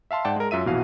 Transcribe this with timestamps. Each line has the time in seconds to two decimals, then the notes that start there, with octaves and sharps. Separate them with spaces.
0.11 E5 F5 A5 C6
0.25 G#2 D5 F#5 G5 A5
0.36 G#3 A#4
0.51 F#2 F4 E5 D#7
0.66 A#1 B2 E3 F#4 F5